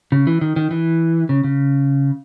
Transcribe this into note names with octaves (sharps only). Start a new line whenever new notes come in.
C#3
E3
D#3
D#3
E3
C#3
C#3